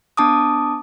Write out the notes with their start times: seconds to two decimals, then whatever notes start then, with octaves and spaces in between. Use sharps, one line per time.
0.17 B3 D4 A5 D6 D#6